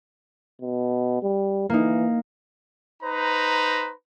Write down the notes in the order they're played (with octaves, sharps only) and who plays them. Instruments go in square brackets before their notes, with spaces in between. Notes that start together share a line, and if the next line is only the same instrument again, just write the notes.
[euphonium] B2
G3
[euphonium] E3 [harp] A#3 D#4
[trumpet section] D#4 B4 C5 A#5